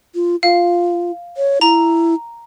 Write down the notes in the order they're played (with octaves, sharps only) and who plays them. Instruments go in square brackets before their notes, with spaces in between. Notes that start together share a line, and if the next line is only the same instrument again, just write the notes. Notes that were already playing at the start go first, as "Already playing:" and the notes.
[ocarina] F4
[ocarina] F4 [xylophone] F5
[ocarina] C#5
[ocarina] E4 [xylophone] A#5